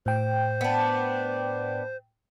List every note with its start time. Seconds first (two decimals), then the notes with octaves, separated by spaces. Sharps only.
0.06 A2 C5 G5
0.61 B3 D4